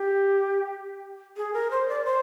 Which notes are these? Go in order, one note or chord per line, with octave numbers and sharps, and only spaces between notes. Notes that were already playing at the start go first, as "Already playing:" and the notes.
Already playing: G4
G#4
A#4
C5
D5
C5